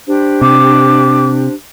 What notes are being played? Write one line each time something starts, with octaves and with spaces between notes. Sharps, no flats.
D4 G4 C5
C3 D6